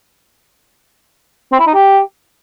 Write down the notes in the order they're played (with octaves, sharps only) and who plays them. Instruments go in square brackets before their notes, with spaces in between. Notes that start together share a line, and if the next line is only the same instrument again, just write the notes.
[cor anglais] C4
E4
D#4
G4